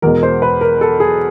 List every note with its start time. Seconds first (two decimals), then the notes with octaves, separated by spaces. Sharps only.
0.02 E2 B2 G#3 A#4
0.23 C5
0.42 B4
0.61 A#4
0.81 A4
1.00 G#4